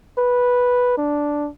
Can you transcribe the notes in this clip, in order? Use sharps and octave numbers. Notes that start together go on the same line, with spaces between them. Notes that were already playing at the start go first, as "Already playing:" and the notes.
B4
D4